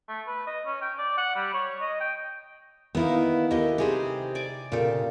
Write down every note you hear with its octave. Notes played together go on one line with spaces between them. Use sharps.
A3
B4
D#5
C#4
G5
D5
F#5
G3
C#5
D#5
G5
D#3 A#3 B3 D#4 E4
D#2 A3 E4 G4 D#5
C3 D#4 G4 G#4 B4 C5
D5 G#5 D6
A#2 C#3 F4 G4 A4